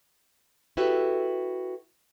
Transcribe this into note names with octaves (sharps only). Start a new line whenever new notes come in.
E4 F#4 G4 A4 B4